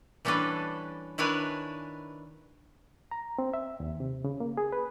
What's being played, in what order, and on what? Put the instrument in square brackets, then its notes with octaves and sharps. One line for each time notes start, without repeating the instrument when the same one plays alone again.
[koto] E3 G3 C#4 D4 A4 B4
D#3 D4 E4 B4 C#5 G#5
[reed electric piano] A#5
C4
E5
D#2
C3
C#3
A#3
G#4
B4